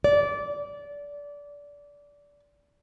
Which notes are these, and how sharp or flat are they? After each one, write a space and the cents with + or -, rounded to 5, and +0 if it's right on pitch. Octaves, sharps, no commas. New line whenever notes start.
D5 -20